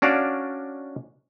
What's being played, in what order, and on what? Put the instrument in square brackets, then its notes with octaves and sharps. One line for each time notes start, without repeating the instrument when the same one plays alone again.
[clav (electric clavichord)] C#4 D4 F#4 D5 F5